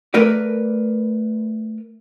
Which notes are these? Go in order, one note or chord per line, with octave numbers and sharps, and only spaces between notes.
A3 A#4 B4 D5